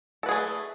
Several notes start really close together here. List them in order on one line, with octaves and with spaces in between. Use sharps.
A4 B4 G#4 A3